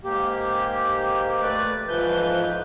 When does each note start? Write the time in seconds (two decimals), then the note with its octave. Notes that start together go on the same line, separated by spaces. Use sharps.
0.04 G#2 A#3 G4
1.42 A3 B4 D5
1.88 F2 G#2 E3 F3 B4 G6